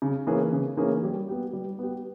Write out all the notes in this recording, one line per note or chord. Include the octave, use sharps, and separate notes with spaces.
C#3
E3 A#3 C#4 G#4
C#3
E3 A#3 C#4 G#4
G3
B3 G4
G3
B3 G4